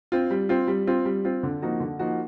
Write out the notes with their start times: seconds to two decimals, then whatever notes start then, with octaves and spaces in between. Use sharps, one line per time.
0.12 C4 F4
0.31 G3
0.49 C4 F4
0.68 G3
0.87 C4 F4
1.05 G3
1.25 C4 F4
1.43 D3
1.62 F3 A#3 D#4 F#4
1.80 D3
1.99 F3 A#3 D#4 F#4